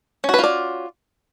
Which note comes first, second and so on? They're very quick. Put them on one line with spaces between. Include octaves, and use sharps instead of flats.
C#4 F#4 B4 F4 D5